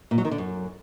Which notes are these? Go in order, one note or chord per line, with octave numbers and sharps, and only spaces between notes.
A#2
F#3
D#3
D3
F#2